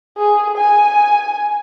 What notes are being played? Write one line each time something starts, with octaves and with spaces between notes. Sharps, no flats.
G#4
G#5